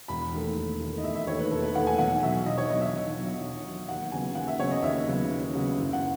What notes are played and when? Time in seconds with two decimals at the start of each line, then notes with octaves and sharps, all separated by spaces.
0.08 E1 B5
0.33 D#2 D#3 A3
0.57 E1
0.80 D#2 D#3 A3
0.98 D#5
1.04 E1 E5
1.15 E5
1.27 D#2 D#3 A3 C#5
1.39 B4
1.51 E1 A4
1.63 B4
1.74 D#2 D#3 A3 F#5
1.87 G#5
1.98 B1 F#5
2.22 B2 F#3 E5
2.46 B1 D#5
2.58 C#5
2.69 B2 F#3 D#5
2.81 E5
2.93 B1
3.18 B2 F#3
3.40 B1
3.64 B2 F#3
3.88 D#2 F#5
4.12 C#3 F#3 B3 G#5
4.35 D#2 F#5
4.47 E5
4.59 C#3 F#3 B3 C#5
4.71 D#5
4.83 D#2 E5
5.07 C#3 F#3 B3
5.31 D#2
5.54 C#3 F#3 B3
5.78 F#1
5.93 F#5